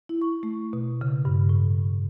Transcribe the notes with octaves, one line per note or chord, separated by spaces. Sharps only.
E4
C#6
A3
B2
C#3
G2
A2